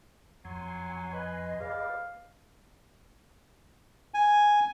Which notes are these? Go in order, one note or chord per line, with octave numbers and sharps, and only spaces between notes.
F2 F#3 G#5 C6
B4 D#5
G#4 B4 D5 F5
G#5